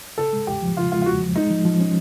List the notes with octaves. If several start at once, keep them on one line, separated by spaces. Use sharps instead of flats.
C#3 A4
G#3
E2 G4
F3
C#3 F4
G#3 F4
F4
E2 F#4
F3
G#3 D#4
F3
F3
C#4